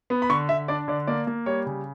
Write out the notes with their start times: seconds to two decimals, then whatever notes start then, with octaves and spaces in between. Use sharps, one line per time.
0.10 B3
0.22 B5
0.29 D3 C#6
0.49 D3 E5
0.68 D4 D5
0.88 D3 D5
1.07 A#3 D5
1.27 A#3
1.46 G3 C#5
1.66 C#3